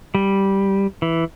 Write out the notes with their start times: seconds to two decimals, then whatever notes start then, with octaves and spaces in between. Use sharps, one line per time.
0.15 G3
1.02 E3